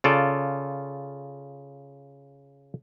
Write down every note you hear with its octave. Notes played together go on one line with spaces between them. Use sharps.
C#3 F4 A4 D5